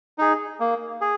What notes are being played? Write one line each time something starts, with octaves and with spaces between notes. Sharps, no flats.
D#4 G#4
A#3
G#4